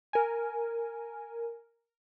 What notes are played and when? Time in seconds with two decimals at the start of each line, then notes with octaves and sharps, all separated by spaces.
0.13 A#4 G#5